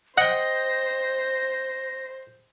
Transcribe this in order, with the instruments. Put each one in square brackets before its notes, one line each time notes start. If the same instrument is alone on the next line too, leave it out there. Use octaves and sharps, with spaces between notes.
[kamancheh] C5 [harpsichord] D#5 G5 [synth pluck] F#5 [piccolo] A#6